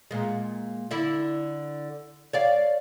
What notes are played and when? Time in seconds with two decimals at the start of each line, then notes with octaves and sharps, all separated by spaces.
0.11 A#2 G#3
0.91 D3 E4
2.33 C#5 D5 F5